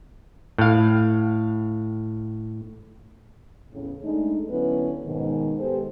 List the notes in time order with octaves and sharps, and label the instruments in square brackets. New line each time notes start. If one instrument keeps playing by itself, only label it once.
[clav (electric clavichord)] A2 F5
[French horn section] E2 A2 C#3
G#3 A3 D4 D#4
D3 F#3 B3 C#4 E4 B4
G#2 B2 D#3
G#3 B3 G4 A4 C5